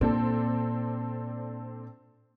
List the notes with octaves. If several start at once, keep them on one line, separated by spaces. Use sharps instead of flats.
A#2 C4 D4 A4